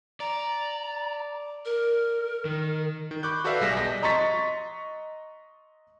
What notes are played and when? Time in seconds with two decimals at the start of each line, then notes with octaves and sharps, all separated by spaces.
0.20 D5 A#5
1.65 A#4
2.45 D#3
3.11 D#3
3.23 B5 C#6 D6 F#6 G6
3.44 F#4 A4 B4 D5 E5 F5
3.61 B1 G3 G#4 A#6 B6 E7
3.77 D#5 A5 G6 A#6 B6
4.02 D#5 A#5 C6 C#6 A6 B6